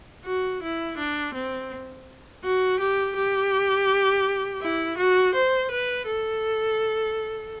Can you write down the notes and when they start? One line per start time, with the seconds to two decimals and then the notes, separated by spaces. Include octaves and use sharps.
0.25 F#4
0.62 E4
0.98 D4
1.34 C4
2.44 F#4
2.79 G4
3.16 G4
4.61 E4
4.98 F#4
5.34 C5
5.71 B4
6.06 A4